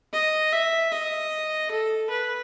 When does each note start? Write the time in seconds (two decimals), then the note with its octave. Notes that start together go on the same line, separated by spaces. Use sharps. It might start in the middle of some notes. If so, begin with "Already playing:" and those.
0.13 D#5
0.52 E5
0.92 D#5
1.71 A4
2.10 B4